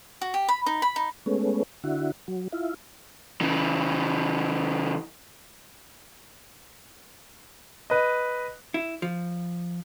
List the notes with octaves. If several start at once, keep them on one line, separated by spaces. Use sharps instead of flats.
F#4
G4
B5
D#4
B5
D#4
G#3 A3 B3 C#4
D3 E4 F#4
F#3
E4 F4
C#3 E3
B4 D#5
E4
F3